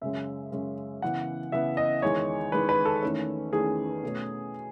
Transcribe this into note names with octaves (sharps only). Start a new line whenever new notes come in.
F#2 C#3 G#3 C#4 E5
F#2 C#3 G#3 C#4
C#3 E3 B3 F#5
C#3 E3 B3 E5
D#5
E2 D#3 G#3 C#5
E2 D#3 G#3 B4
B4
A4
E2 D#3 A3 C#4
E2 D#3 A3 C#4 G#4
B2 A3 C#4